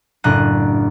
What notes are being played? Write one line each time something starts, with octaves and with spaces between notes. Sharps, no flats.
F#1 A2 D4 A#5 F#6 D#7